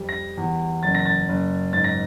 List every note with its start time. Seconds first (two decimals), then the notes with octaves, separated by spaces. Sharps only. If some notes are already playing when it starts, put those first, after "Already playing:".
Already playing: F2 G3
0.09 A#6
0.38 E2
0.83 F#1 A6
0.95 A#6
1.06 A6
1.28 F#1
1.73 G#2 A6
1.84 A#6